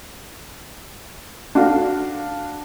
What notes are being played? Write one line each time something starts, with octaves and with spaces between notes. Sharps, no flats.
D4 F#4 A4 F5